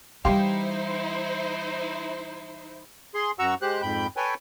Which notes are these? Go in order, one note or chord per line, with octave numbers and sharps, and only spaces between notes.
E3 G3 D#4 E4 G4 C5 F5 C6
G#4 C6
F#2 F#4 F#5 A#5 C#6 E6
G#3 G4 C5 F#6
F2 G#2 G5 B5 G6
A4 B4 C#5 G5 G#5